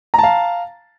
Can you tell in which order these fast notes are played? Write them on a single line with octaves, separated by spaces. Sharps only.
A#5 A5 F5